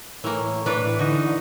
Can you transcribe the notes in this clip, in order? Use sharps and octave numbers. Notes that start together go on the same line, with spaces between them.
A2 E3 A#3 C#5
E3 D4 B4
D3 D#4 F#4